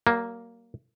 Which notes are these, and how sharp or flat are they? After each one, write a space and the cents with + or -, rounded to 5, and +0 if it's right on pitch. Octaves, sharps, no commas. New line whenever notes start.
F#3 +45 A#3 +0